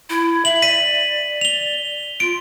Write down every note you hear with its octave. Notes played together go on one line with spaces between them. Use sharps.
E4
E5 F#7
D5 B6 D#7
F7 G7
F4 D7